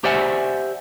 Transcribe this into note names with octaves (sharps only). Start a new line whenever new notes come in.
G4 C5 D5 E5 F#5 G#5